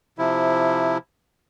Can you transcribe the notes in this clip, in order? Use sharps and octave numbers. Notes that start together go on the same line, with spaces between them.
C3 F3 E4